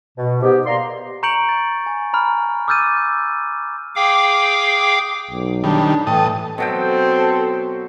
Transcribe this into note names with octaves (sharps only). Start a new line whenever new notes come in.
B2
G#2 B3 G4
A#3 D5 A#5 C6
A#5 C#6 G6 C#7 D7 F#7
A6
G#5
A#5 B5 F6
D6 E6 F6 G6 A6 D#7
G#4 F5 G5 D6
B1
D#3 G3 D4
A2 E3 A3 G5 A5 D#6
B2 F#3 C4 A4 G5